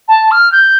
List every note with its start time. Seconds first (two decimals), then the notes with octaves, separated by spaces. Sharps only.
0.08 A5
0.31 F6
0.52 G6